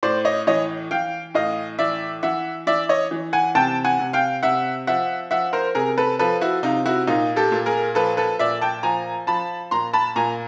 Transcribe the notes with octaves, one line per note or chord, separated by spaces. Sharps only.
A2 C5 D5
C#5 D#5
E3 C#5 D#5
E3 F5 G5
A2 D#5 F5
E3 D5 E5
E3 E5 F#5
E3 D5 E5
C#5 D#5
E3
F#5 G#5
C3 G5 A5
F#5 G#5
C3
F5 G5
C3 E5 F#5
F3 E5 F#5
F3 E5 F#5
A#4 C5
C3 G#4 A#4
A4 B4
F3 A4 B4
E4 F#4
C3 D#4 F4
E4 F#4
A#2 D#4 F4
G4 A4
A#2
G#4 A#4
F3 A4 B4
A4 B4
A#2 D5 E5
G5 A5
F3 G#5 A#5
F3 A5 B5
A#2 A#5 C6
A5 B5
A#2 G#5 A#5